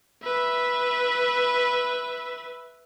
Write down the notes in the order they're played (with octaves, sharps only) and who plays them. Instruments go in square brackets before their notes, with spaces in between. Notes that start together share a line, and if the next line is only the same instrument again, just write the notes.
[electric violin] B4 E5